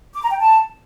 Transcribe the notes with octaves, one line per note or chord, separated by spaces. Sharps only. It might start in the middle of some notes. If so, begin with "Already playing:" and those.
D6
A#5
G5
A5